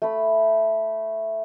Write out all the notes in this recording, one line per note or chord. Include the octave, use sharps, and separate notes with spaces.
A3 B5